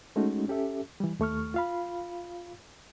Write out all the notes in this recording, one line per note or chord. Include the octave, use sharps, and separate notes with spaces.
G#3 A3 C#4 D#4 F#4
C#4 G4 A4 E5
E3 G3
D#2 A3 C#6 F6
F4 F5 B5